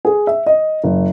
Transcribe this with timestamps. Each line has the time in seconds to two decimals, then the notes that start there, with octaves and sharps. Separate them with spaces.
0.05 G#4
0.27 E5
0.46 D#5
0.84 F#1